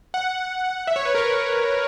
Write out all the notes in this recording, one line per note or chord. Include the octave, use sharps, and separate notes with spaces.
F#5
E5
C#5
B4
A#4
C#5